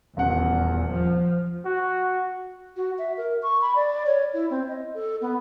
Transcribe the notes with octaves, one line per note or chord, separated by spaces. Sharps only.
D#1 E2 F#5
F3
F#4
F#4
E5
A#4
C#6
B5
D5
C#5
E4
C4
D#5
A4
B3